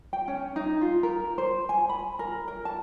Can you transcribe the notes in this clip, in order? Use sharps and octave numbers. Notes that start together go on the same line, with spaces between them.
G5
C#4
D#4
F4
A#4
C5
G#5
B5
A#4
A#4
A5